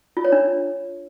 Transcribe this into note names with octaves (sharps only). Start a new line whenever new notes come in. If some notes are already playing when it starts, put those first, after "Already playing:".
F4
C#5
D4